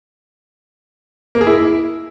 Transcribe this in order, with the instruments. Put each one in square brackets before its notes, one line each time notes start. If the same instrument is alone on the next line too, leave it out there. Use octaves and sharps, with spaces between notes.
[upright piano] A#3
G#4
E4